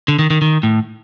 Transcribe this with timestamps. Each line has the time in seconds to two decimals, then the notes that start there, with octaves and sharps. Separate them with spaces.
0.08 D3
0.19 D#3
0.30 D#3
0.42 D#3
0.63 A2